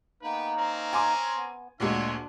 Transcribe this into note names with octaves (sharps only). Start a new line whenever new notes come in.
A#3 B3 D#4 B4 G5
C4 C#4 A#5
G#5 C6 D6
B3
D2 A#2 G#3 D4 C#5 E5 F#5